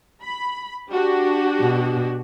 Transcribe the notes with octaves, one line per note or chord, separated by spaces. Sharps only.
B5
D4 F#4 G4
B2